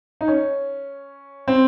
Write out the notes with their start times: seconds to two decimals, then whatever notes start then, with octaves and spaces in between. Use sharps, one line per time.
0.21 D#4
0.28 C#4
1.48 C4